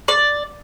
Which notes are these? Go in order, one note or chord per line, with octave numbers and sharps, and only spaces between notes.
D5